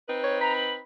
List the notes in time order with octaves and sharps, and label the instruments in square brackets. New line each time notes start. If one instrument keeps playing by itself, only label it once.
[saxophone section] C4 D#4 B4
[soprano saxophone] C#5
[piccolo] A#5 [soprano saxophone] B5
[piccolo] F#7